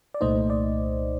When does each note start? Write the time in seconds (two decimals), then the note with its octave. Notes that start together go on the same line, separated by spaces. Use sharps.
0.14 D5
0.21 C2 A#2 A3 D#4 C5 D#5
0.50 D5